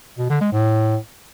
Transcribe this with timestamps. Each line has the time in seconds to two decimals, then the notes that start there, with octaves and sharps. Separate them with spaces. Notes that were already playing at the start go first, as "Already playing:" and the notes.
0.19 B2
0.30 D3
0.41 G#3
0.52 A2